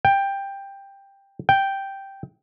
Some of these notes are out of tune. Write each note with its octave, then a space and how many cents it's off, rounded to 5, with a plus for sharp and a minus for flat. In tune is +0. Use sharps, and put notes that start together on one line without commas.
G5 +10
G5 -5